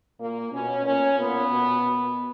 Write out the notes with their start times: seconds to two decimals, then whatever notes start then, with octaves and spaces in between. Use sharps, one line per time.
0.19 A#2 A#3
0.52 B2 C#4
0.85 A#2 C#4
1.18 A#2 B3
1.50 B2
1.84 B2